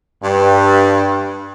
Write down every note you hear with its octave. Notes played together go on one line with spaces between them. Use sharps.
G2